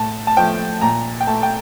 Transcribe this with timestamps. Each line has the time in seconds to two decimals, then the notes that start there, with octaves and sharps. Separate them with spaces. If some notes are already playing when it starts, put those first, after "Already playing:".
Already playing: A2 A5
0.27 A5
0.37 F3 A3 G5
0.81 A#2 A#5
1.21 G5
1.27 A3 A5
1.43 G5